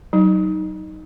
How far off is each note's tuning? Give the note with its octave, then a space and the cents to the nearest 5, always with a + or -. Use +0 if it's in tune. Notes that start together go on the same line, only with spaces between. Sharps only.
F#3 +25 D#4 +0